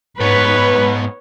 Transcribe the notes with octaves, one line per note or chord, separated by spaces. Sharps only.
G#2 B3 D#4 B4 C#5